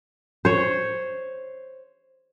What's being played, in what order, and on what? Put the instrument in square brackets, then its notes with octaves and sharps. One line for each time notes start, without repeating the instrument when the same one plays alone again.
[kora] C5 C#5